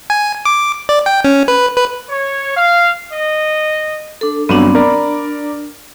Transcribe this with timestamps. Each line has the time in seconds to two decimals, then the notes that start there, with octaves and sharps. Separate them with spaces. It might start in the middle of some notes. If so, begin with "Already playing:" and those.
0.10 G#5
0.45 D6
0.89 D5
1.06 G5
1.25 C#4
1.48 B4
1.76 B4
2.09 C#5
2.56 F5
3.12 D#5
4.21 D4 A4
4.49 G2 F#3 B3 C4 D4
4.75 A#4 D5 B5
4.91 D4